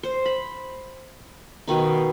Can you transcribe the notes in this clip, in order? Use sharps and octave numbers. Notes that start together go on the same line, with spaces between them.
C5
B5
B2 D#3 D#4